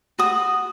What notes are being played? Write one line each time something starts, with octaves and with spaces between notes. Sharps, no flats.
F#4 D#6